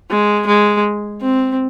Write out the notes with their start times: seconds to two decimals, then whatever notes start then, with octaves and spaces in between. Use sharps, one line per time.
0.11 G#3
0.47 G#3
1.22 C4